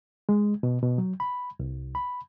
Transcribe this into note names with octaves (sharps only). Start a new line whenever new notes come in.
G#3
B2
B2
F#3
B5
C2
B5